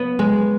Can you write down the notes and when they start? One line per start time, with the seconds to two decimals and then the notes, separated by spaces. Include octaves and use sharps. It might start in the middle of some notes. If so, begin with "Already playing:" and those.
Already playing: B3
0.19 G#3